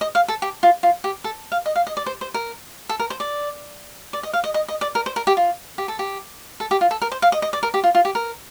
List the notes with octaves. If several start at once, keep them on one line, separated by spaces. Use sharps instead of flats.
D#5
F5
A4
G4
F4
F4
G4
A4
F5
D#5
F5
D#5
D5
C5
C5
A#4
A4
A#4
C5
D5
D5
D#5
F5
D#5
D#5
D#5
D5
A#4
C5
A#4
G4
F4
G4
A4
G4
A4
G4
F4
A4
A#4
C5
F5
D#5
D#5
D5
A#4
G4
F4
F4
G4
A#4